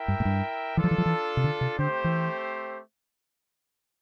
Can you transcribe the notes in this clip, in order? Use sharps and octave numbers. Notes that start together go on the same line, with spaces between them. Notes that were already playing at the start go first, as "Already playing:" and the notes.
Already playing: E4 A#4 E5 G5
G2
A2
G2
E3 D4 F4 A4
F3
E3
F3
E3
C3
D3
C3
D3 A3 C4 G4 C5
E3